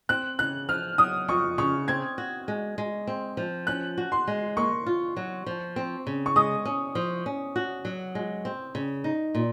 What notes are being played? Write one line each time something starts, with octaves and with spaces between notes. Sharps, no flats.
C4 F#6
C#3 F#6
F3 F6
F#3 D#6
F2 C#6
C#3 C#6
C4 G#6
F#4
G#3
G#3
C4
F3
C#4 F#6
F#4
C6
G#3
A#3 C#6
F4
F#3
F3
C4
C#3
C#6
G#3 D#6
C#4
F3
C#4
F#4
F#3
G#3
C4
C#3
D#4
A#2